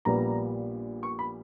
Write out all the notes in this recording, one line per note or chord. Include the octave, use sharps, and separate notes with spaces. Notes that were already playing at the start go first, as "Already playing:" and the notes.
A#1 A#2 G3 B3 A#5
C#6
B5